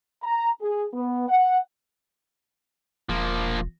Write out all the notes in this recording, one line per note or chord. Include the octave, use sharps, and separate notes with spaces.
A#5
G#4
B3
F#5
E1 F3 A#3